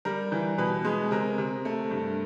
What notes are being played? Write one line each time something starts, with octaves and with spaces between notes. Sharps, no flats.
G3 A#4
E3
B2 B4
G#3
C3 A#4
C3
A3
G2